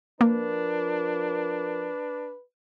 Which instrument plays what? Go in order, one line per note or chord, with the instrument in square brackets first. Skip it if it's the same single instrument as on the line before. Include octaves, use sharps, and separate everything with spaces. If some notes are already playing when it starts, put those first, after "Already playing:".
[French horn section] F3 A#4 [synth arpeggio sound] A#3 [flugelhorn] D4 [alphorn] B4